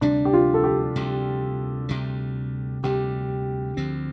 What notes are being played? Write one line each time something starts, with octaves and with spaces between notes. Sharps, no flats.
D2 C3 G3 D4
G4
F4
A4
G4
D2 C3 G3
D2 C3 G3
D2 C3 G3 G4
D2 D3 F3 C4